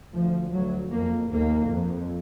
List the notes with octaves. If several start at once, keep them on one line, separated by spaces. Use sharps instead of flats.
D2 F3
D2 F#3
F2 A#3
D#2 A#3
F2